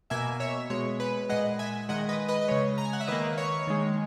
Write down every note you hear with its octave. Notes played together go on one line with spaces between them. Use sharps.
B2 A#3 E5 G#5
C#5 E5
B2 G#3 C#5
B4
A#2 G#3 D#5 F#5
E5 G#5
D#3 G#3 D#5 F#5
B4 D#5
B4 D#5
D#5
C#3 G#3 C#5
A#5
G#5
F#5
E5
D#3 A#3 B4 D#5
C#5
D#3 G#3